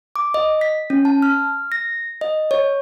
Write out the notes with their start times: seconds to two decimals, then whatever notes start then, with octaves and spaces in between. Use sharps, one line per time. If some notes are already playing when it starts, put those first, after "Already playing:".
0.16 D6
0.34 D#5
0.61 B6
0.90 C#4
1.05 A5
1.22 F6
1.72 A#6
2.21 D#5
2.51 C#5